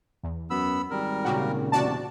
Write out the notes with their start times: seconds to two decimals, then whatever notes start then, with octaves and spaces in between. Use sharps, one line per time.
0.23 E2
0.50 F#2 B3 B5 E6
0.91 G#1 G3 A#4
1.25 A#2 C#3 F#4 G4
1.72 E1 C3 F#4 D5 A5